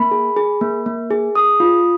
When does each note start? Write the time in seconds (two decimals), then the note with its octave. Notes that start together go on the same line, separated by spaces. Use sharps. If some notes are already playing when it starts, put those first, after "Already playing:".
Already playing: A#3 B5
0.11 G#4
0.37 G#4
0.61 A#3
0.86 A#3
1.11 G#4
1.35 G#4 D#6
1.60 F4